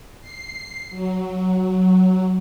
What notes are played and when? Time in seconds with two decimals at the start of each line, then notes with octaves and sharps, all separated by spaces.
0.21 C7
0.90 F#3